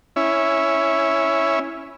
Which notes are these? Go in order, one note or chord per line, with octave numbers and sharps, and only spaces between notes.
C#4 E4